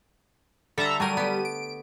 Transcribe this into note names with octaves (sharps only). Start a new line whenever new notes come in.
D3 G3 A4 E5 A#5
F#3 G3 A3 A#4 D#7
B3 G4
D7